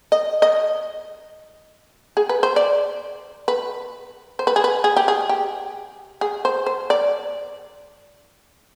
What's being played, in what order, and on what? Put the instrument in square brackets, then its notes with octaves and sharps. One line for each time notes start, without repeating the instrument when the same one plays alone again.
[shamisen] D#5
D#5
G#4
B4
C5
D5
B4
C5
B4
G#4
B4
G#4
G4
G#4
G4
G#4
C5
C5
D5